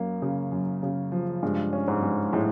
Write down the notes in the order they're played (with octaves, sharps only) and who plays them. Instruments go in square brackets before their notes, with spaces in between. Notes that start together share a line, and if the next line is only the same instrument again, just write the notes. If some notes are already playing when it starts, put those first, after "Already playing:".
Already playing: [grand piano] F#2 A#3
C#3
F#2
C#3
F3
[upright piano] G2 [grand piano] G#3
[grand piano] C#4
[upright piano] G#2
[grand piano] G#3
[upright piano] A2 [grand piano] G#3